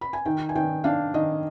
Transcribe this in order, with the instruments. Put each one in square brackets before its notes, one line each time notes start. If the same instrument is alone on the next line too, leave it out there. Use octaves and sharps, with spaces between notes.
[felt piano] B5
G#5
D#3 G5
G#5
D#3 G5
D4 F5
D#3 D#5